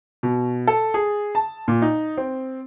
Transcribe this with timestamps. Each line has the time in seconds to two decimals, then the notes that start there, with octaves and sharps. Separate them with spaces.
0.23 B2
0.67 A4
0.94 G#4
1.35 A5
1.68 A#2
1.82 D#4
2.17 C4